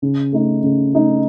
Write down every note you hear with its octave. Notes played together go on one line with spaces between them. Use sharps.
C#3
A3 D#4
C#3
A3 D#4